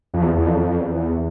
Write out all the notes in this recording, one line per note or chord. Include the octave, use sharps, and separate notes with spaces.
F2
E2
E2
F2
E2